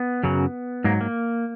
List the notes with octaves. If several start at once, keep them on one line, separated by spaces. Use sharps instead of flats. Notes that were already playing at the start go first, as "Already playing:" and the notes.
Already playing: B3
F#2 C#3 F#3
G#2 F#3 A#3
A#3